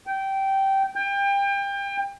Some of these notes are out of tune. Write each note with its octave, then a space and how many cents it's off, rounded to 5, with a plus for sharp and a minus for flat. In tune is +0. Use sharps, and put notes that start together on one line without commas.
G5 -15
G5 +30